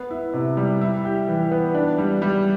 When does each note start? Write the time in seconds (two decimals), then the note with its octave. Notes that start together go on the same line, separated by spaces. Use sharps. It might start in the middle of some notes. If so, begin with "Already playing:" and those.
Already playing: B3
0.10 E4
0.34 C3
0.57 G3
0.81 E4
1.05 G4
1.28 E3
1.51 B3
1.74 D4
1.98 G3
2.22 G3